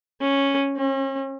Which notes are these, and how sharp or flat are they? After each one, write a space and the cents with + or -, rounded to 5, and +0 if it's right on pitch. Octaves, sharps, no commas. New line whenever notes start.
C#4 -5
C#4 -40